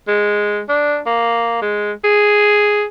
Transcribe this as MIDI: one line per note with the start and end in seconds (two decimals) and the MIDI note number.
0.08 0.60 56
0.69 0.99 62
1.06 1.58 58
1.62 1.92 56
2.04 2.84 68